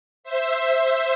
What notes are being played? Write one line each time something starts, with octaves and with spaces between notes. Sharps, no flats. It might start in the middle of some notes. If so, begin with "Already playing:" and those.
C5 E5